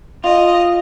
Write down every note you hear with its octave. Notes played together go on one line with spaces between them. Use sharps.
F4 D#5